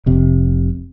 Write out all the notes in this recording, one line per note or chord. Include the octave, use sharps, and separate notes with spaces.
F1 C3